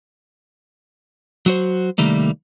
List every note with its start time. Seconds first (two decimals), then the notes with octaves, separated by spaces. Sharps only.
1.46 F#3 F#4 C5
1.98 C2 D#3 G3 A3 A#3